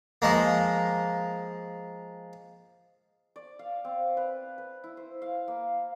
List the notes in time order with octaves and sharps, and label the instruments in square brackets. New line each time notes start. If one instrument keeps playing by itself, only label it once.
[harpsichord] F3 G#3 A#3
[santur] D5
F5
C4
B4
B4
E4
C5
F5
A#3